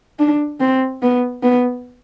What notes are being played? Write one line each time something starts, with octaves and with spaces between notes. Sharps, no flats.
D4
C4
B3
B3